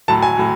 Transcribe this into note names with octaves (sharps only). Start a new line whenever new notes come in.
A2 F#3 A5
G#5
A2 F#3